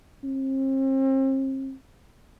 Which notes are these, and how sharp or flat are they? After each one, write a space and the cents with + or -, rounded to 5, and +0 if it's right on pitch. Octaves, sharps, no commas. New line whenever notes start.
C4 +40